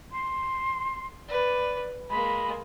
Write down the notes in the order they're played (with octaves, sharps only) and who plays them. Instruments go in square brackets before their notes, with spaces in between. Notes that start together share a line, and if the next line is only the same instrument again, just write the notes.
[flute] C6
[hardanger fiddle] B4 [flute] D5
[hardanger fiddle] G#3 A#3 [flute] B5